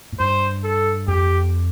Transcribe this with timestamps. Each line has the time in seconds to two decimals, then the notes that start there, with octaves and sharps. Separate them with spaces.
0.12 A2
0.19 G2 C5
0.64 A4
1.07 F2 G4